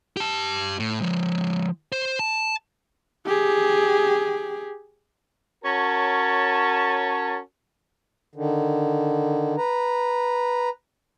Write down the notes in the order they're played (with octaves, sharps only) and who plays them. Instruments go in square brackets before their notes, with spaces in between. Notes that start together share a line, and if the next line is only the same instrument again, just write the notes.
[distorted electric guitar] G4 A5
A2
F3 G#3
C5
A5
[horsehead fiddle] G4 G#4
[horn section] C#4 F#4 A#4 C#5 A5
[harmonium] D3 D#3
B4 A#5